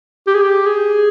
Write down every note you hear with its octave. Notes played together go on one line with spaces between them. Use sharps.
G4
G#4
G4
G#4